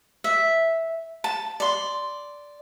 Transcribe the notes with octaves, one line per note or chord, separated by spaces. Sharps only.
E5
A5
D5 C6